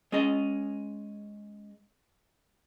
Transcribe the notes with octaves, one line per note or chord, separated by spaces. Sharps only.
G#3 C#4 G#4 D#5